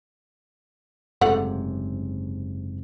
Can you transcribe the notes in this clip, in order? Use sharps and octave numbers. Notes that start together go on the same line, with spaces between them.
F#1 G#2 C3 A3 F4 F#5